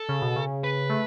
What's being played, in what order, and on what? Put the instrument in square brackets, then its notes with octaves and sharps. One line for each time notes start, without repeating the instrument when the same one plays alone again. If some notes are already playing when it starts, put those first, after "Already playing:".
Already playing: [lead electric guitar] A4
[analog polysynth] C#3
B2
C#3
[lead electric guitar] B4
[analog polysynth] A3